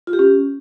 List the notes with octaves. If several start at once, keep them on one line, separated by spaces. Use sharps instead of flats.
F4
G4
C#4